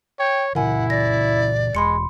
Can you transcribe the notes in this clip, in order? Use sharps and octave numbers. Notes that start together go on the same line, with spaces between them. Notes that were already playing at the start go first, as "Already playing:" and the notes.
C#5 G5
A#2 C#3 E3 E4 A#4 F#5 G#5
D5 A#6
E1 G#3 B5 C6 C#7